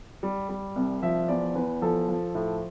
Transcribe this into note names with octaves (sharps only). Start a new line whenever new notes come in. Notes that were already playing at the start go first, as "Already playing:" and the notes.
G3
G3
C2
F3 E5
E2 D5
E2 B4
F3 A4
F3
A2